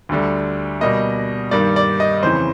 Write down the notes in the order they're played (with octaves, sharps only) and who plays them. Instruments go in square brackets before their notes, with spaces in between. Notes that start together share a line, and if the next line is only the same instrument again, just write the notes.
[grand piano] D2 D3 G3
B2 G3 A#3 D#5
G2 D#3 G3 A#3 D5
D5
D#5
F2 C#3 E3 C5